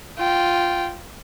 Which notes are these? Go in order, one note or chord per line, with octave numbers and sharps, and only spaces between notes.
F4 G5